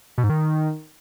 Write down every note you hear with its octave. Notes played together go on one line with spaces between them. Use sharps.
B2
G#2
D#3